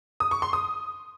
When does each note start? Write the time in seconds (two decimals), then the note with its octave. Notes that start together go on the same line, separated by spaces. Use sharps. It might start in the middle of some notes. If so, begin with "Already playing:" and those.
0.20 D#6
0.31 C#6
0.42 C6
0.53 D#6